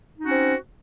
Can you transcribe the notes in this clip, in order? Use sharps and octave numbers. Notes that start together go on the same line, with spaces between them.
C4 C#4 D#4 F#4